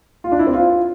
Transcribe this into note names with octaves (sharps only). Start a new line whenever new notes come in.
F4
D4
E4
C4
F4